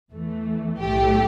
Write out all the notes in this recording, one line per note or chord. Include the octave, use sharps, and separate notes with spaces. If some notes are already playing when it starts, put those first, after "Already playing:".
E2 E3 A3
B1 A2 A3 G4